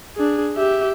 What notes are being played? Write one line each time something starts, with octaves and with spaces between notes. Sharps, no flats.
D4 G#4
G4 E5